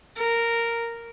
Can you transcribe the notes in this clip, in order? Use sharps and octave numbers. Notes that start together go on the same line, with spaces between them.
A#4